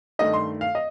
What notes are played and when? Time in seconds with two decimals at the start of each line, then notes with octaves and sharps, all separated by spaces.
0.19 G2 D#3 A3 D#5
0.34 C6
0.61 F5
0.75 D#5